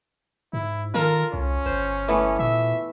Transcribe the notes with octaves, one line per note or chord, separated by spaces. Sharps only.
G#2 E4
D#3 F4 A4 A#4
C2 C#4
G1 C5
E3 A3 B3
A#2 E5